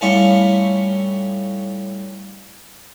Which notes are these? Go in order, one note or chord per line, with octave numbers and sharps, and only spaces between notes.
A2 G3 C#4 E4 F4 C#6